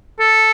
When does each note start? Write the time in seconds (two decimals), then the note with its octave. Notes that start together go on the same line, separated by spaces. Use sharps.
0.19 A4